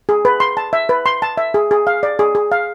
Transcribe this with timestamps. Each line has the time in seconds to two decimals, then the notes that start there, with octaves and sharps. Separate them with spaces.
0.09 G#4
0.25 B4
0.40 C6
0.57 A5
0.73 E5
0.89 B4
1.06 C6
1.22 A5
1.37 E5
1.54 G#4
1.71 G#4
1.87 F5
2.03 D5
2.19 G#4
2.35 G#4
2.52 F5